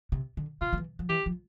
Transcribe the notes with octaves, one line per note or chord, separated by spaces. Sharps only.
C3
D3
C3 F4
F3
E3
F3
E3 G4
F3